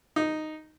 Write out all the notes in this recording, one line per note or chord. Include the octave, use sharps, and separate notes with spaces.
D#4